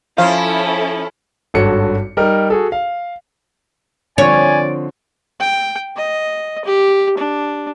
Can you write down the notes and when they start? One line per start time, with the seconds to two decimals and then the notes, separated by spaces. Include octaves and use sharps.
0.18 F3 C#4 E4 A4 F5
1.54 G#1 G2 F#4 A4 C#5 C#7
2.17 G3 D#4 A#4
2.50 F#4 G#4 A4
2.72 F5
4.18 D3 F3 C4 C#5 D5 G#5
5.40 G5
5.96 D#5
6.65 G4
7.17 D4